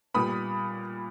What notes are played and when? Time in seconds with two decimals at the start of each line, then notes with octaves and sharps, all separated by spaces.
0.14 A#2 G3 B3 B5 D#6